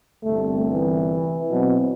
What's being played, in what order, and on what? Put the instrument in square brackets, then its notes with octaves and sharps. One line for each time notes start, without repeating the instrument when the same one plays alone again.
[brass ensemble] G1 C2 C3 [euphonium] A3
[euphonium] E3
[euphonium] B2 [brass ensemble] F#3 C4